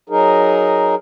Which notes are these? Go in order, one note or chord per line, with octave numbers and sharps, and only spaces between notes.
F#3 D#4 G#4 A#4